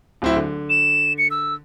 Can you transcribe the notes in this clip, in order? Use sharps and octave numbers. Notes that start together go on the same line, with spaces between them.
D1 C4 E4
D3
E7
C#7
E6